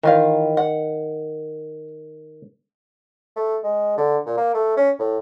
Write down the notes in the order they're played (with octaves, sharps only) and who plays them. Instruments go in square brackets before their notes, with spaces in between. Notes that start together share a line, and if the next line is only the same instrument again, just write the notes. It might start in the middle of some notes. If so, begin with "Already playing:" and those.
[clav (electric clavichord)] D#3 [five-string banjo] E3 F4 F5
[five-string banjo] F#5
[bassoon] A3
G#3
D3
A#2
A#3
A3
C#4
A2